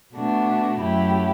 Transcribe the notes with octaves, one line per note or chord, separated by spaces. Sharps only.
B2 A3 D4 F#4
F#2 F#3 A3 E4 G4